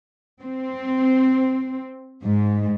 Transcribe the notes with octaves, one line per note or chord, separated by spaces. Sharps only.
C4
G#2